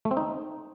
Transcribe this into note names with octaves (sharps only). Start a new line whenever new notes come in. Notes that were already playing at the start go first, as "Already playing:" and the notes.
A3
C4
D#4